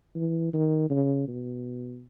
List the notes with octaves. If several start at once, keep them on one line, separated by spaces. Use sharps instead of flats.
E3
D#3
C#3
B2